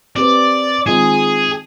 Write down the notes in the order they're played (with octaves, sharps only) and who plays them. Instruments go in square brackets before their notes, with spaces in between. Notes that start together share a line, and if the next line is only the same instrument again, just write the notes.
[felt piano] C4 G4 B4 [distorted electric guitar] D5
[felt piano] D#3 G#3 C4 F4 [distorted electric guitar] G#4